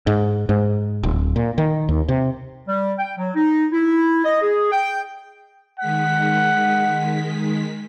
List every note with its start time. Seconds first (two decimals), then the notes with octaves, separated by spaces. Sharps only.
0.07 G#2
0.49 G#2
1.03 D1
1.36 A#2
1.58 D#3
1.89 D#2
2.09 C3
2.68 G3
2.99 G5
3.18 F#3
3.35 D#4
3.72 E4
4.25 D#5
4.42 G#4
4.72 G5
5.79 D#3 G#3 F#5 B6